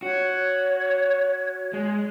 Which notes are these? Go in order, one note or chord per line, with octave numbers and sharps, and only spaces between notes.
F#4 C#5
G#3